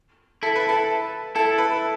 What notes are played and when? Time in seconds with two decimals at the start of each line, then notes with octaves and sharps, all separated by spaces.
0.43 E4 A4
0.56 B4
0.69 A4
1.35 E4 A4
1.58 B4